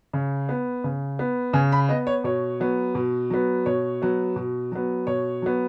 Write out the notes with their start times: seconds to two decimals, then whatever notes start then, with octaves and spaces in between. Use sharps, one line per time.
0.14 C#3
0.49 B3
0.84 C#3
1.19 B3
1.53 C#3 G#5
1.72 B5
1.89 B3 D#5
2.07 C#5
2.24 B2 C#5
2.60 F#3 B3
2.95 B2
3.30 F#3 B3
3.66 B2 C#5
4.02 F#3 B3
4.36 B2
4.72 F#3 B3
5.07 B2 C#5
5.42 F#3 B3